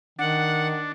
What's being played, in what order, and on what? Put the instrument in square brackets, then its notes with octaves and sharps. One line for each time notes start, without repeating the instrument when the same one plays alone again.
[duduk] D#3 [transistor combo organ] D4 [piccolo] F#5